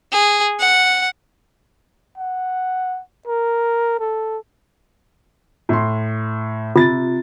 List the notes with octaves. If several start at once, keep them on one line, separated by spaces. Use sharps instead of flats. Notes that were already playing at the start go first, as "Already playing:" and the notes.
G#4
F#5
F#5
A#4
A4
A2 C6
C3 F4 A6